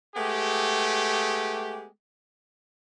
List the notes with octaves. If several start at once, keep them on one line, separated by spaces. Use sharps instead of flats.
G#3 A3 B3 G4